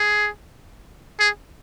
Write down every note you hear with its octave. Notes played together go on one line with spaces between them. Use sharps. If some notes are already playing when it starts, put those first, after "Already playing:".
Already playing: G#4
G#4